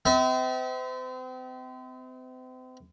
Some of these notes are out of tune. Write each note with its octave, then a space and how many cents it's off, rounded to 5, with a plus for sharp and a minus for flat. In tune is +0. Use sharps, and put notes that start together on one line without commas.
C4 -40 E5 -40